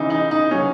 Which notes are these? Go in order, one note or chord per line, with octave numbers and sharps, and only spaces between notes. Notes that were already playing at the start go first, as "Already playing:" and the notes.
Already playing: C#3 E3 D#4
D#4
D#4
C#3 F#3 C#4